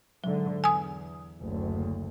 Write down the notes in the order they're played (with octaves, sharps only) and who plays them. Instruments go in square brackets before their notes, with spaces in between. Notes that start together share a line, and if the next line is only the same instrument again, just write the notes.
[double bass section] G#2 D3 [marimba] F#3
[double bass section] E2 [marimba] G#5 D#6
[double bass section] F#1 D2